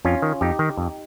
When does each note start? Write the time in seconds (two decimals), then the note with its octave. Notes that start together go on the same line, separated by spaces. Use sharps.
0.05 F2 C#4 F4
0.22 D#3
0.41 F2 D#4 G4
0.59 D#3
0.77 F2